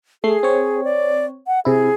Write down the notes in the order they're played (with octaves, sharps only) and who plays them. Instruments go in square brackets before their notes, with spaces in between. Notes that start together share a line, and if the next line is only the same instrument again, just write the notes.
[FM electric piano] A3 C7 [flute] G#4
[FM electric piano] C4 C#5
[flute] D5
F#5
[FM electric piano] C3 E4 [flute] G#4